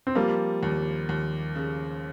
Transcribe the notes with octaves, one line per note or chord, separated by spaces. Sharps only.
C4
F3 G3 A#3
D#2
D#2
C#3